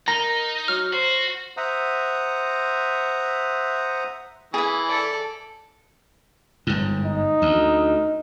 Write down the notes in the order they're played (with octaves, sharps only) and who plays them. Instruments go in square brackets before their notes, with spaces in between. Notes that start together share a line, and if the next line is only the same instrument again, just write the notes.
[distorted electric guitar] D#4 [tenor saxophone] A#4 [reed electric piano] A#5 [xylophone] A#6
[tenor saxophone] F#3 [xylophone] F6
[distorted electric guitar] F#4 [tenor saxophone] C5
[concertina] C5 E5 F#5 A#5 D#6
[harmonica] E3 [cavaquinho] G#4 E5
[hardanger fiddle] A4 D5
[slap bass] G1 G#2
[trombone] D#4
[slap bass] D2